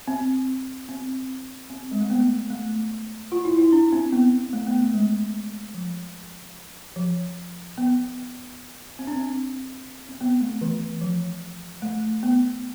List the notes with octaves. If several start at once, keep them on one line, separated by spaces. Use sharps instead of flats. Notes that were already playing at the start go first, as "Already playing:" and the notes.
C4
C4
C4
G#3
A3
B3
A3
F4
E4
E4
D4
C4
B3
A3
B3
A3
G#3
F3
F3
B3
C4
D4
C4
C4
B3
A3
E3
F3
A3
B3